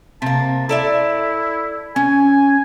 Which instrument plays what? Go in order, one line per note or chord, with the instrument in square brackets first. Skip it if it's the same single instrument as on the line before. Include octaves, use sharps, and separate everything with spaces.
[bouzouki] C3 A#3 [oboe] A5
[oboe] E4 [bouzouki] A4 D5 E5
[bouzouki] C#4 [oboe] G#5